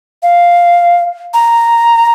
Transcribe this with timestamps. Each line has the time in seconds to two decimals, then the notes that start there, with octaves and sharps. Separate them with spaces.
0.23 F5
1.34 A#5